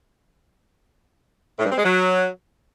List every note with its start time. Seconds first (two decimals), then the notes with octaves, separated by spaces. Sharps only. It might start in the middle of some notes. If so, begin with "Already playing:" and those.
1.59 A2
1.65 G2
1.72 C4
1.78 G#3
1.84 F#3